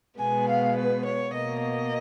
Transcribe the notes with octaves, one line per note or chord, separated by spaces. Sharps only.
B2 G#3 B3 G#5
F5
B4
C#5
B2 A#3 D#5
D#5